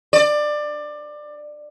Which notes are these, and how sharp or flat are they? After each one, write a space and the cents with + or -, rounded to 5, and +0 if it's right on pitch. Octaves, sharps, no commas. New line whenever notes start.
D5 +20